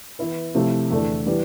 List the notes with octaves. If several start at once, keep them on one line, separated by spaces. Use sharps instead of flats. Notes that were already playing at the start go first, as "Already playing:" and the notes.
E3 B3 E4 B4
C3 F3 A3 E4 G4
E2 D3 A3 D4 A4
E3 G3 B3